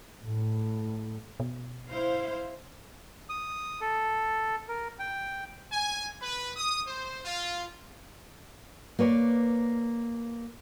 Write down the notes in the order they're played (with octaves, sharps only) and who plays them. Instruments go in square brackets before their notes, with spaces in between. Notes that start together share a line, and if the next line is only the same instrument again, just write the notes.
[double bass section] A2
[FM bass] B2
[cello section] E4 C5 F5
[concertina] D#6
A4
A#4
G5
[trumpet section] G#5
B4
D#6
C5
F4
[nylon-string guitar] A#3 B4 C#5 D5